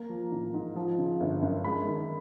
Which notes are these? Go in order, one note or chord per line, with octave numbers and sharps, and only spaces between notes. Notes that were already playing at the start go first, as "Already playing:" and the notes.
Already playing: A#3 A#5
F3
A1
G#2
F3
C#3
G1
F#2
G#3 B5
D#3